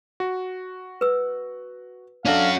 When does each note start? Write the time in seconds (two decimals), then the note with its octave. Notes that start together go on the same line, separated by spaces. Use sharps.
0.20 F#4
1.01 B4 E6
2.25 C#4 D4 F#4 A4 F5